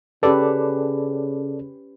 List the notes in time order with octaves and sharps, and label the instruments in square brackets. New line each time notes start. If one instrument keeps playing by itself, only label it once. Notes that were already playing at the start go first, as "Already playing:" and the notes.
[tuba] C#3 [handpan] C#4 G4 B4 [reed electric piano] A4 D5